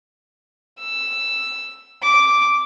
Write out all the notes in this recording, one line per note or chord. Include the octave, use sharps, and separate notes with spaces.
E6
D6